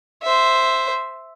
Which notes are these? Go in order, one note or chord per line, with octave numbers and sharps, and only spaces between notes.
C5 E5